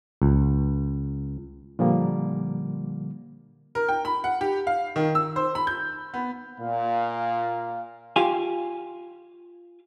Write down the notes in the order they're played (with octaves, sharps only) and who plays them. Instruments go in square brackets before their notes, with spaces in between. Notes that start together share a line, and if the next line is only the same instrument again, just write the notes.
[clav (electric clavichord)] C#2
[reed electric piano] A#2 D3 F3 G3 A#3
[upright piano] A#4
G5
B5
F#5
G4
F5
D#3
E6
C5
B5
G6
B3
[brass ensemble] A#2 [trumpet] F5
[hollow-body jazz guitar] F4 G4 F5 G#5